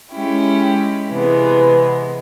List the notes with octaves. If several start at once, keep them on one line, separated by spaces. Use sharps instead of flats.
G#3 C#4 E4 G4
C3 E3 G#3 B3